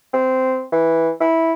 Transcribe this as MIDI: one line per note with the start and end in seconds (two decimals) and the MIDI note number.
0.13 0.64 60
0.72 1.11 52
1.20 1.53 64